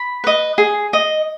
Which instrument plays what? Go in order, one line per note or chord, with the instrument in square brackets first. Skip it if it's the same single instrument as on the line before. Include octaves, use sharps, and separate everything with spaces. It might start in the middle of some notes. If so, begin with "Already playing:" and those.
Already playing: [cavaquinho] B5
B4 D#5
G#4
D#5